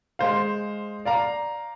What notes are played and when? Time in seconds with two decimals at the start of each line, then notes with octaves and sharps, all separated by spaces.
0.19 G#3 C5 F5
1.05 D5 F5 A#5